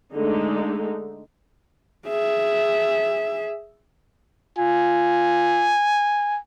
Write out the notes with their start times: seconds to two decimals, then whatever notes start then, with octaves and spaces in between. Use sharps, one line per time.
0.15 D3 G#3 A3 D#4
2.07 G#4 E5
4.59 F4 G#5